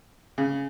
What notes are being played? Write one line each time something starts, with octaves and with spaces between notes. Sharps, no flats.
C#3